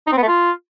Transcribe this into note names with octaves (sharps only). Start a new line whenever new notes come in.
D#4
C4
B3
A3
F4